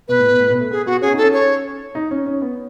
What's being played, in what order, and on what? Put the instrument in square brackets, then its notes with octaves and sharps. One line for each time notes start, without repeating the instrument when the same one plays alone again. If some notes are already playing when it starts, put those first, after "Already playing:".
[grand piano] B2 [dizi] B4
[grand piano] A2
B2
A2
B2
A3
[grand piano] B3 [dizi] G#4
[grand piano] B3 [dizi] F#4
[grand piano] C#4 [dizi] G#4
[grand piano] D#4
[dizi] A4
[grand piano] C#4
[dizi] C#5
[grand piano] D#4
C#4
C#4
B3